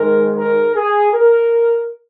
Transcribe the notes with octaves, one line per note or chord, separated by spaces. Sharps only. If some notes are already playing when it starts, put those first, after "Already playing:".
Already playing: G#2 D#3 G#3 A#4
A#4
G#4
A#4